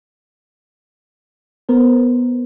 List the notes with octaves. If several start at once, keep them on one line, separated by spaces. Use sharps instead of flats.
B3 A#4 C5